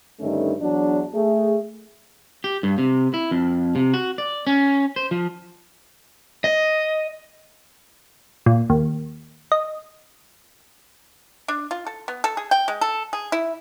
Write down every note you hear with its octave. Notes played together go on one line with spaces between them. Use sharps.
G2 D3 D#3 A3 C#4 D#4
E2 F#3 D4
A3 G#4
G4
G2
C3
E4
F2
C3
F#4
D5
C#4
C5
F3
D#5
A#2
D#2
D#5
D4
F4
A4
B3
A4
G#4
G5
G#3
A4
G#4
E4